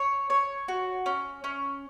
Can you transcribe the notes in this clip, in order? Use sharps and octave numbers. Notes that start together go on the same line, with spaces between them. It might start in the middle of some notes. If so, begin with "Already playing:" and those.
Already playing: C#5
C#5
F#4
C#4
C#4